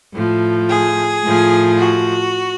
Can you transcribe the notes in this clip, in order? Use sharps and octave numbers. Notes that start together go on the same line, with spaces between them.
A2 F3
G#4
A2 F3
F#4